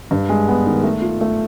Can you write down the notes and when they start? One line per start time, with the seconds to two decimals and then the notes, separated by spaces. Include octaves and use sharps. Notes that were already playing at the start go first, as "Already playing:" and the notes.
0.11 G2
0.29 G#3
0.48 B3
0.67 D#3
0.84 A3
1.02 F4
1.21 A3